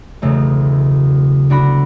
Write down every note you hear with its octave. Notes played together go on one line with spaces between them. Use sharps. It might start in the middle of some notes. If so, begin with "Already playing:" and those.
E1 B1 C#3 A3
D2 D4 F#4 B5 A#6